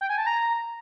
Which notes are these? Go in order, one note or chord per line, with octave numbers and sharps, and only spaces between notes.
G5
G#5
A5
A#5